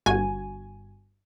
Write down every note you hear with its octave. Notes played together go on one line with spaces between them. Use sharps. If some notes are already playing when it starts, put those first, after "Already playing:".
G1 G2 F#4 G#5